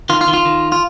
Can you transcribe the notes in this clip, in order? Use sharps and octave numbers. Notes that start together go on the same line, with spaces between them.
D#3 F4
F4
D#3
F4
D#3
F4